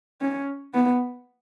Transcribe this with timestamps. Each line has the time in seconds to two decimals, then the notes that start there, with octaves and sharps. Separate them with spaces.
0.21 C#4
0.74 B3